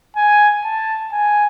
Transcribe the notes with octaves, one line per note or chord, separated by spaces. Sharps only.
G#5
A5
G#5